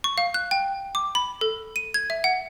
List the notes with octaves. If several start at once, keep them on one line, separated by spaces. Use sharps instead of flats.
C#6
F5
F#6
G5
D6
B5
A4
D#7
G#6
E5
F#5